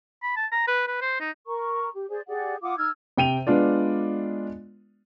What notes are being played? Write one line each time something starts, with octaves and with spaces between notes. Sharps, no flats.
B5
A5
A#5
B4
B4
C5
D#4
A#4 A#5 C#6
G4
G#4 C5 D5
G4 G#4 D5 F#5
F4 F#5 D6 D#6
D#4 E6 F6 G#6
C3 G5 D#7 F7
G#3 B3 D4 F4 D5